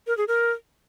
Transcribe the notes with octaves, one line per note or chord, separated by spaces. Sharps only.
A#4
G#4
A#4